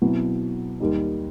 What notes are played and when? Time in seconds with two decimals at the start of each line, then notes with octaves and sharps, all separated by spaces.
0.02 B2 F#3 C4 E4
0.80 D#2 D#3 G3 D#4